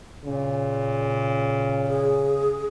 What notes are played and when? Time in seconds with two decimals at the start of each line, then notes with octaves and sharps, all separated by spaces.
0.25 A#2 C#3
1.87 G#4